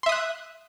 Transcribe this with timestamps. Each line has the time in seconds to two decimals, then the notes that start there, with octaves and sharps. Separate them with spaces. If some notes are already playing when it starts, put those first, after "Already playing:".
0.03 C6
0.06 E5
0.09 D#6
0.12 F#6